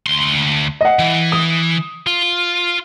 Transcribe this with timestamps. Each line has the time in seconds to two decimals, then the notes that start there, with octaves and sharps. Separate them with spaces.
0.06 D2 C6
0.81 D#5 F#5
0.99 E3
1.32 D#6
2.07 F4